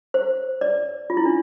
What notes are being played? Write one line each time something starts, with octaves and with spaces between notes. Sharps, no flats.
C5
D5
F4
E4
D4